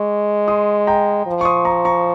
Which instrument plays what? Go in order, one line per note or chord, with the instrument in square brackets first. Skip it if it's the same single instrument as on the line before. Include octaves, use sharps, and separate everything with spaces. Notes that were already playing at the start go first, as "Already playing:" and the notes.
Already playing: [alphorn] G#3 [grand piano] C#6
[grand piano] C6 D#6
G5 A#5
[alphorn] F3
[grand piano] C#6
C6 D#6
A#5 C#6
A#5 C#6